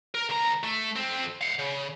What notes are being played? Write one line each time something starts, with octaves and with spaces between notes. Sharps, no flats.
A#4
C#2 A#5
A3
F2 C4
F5 F#5
C#3